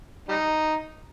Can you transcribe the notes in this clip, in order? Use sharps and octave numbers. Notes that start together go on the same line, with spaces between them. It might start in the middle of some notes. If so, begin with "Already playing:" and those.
G3 D#4